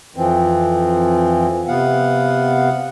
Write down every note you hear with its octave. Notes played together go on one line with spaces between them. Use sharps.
F2 E3 F3 C4
C3 B3 F5 F#5